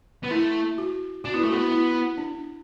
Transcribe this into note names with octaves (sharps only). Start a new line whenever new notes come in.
B3
A3 E4
F#4
D4 F#4
B3 E4
A3 F#4
B3
E4
D4